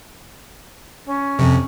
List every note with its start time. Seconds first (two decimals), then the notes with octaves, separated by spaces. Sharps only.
1.05 C#4
1.39 F2 C3